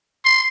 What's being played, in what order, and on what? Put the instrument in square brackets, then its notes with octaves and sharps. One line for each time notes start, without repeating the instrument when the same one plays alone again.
[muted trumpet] C6